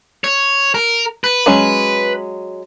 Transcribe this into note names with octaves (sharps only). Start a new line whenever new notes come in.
C#5
A#4
B4
F#3 G#3 C#4